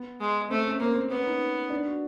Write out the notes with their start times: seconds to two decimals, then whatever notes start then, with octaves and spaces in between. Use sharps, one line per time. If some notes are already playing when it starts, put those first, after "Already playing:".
Already playing: B3
0.20 G#3
0.50 A3 C4
0.66 C#4
0.80 A#3 C4
0.95 C4
1.10 B3 C#4
1.26 D#4
1.70 D4
1.86 F#4